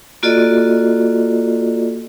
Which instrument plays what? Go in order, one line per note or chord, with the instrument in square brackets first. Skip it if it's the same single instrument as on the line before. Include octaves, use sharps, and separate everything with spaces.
[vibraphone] A#3 F4 F#4 A4 D5 D#5